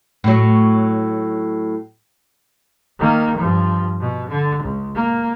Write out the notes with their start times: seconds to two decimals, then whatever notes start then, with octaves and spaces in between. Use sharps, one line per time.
0.24 A2 F#3
2.99 D#3 A#3
3.37 G2 F3
4.00 B2
4.29 D3
4.63 C#2
4.95 A#3